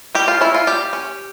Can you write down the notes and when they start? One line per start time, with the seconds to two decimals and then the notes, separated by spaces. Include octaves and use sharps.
0.15 G3 G4
0.28 F4
0.41 C#4 E4
0.54 F4
0.67 G3 G4
0.93 C#4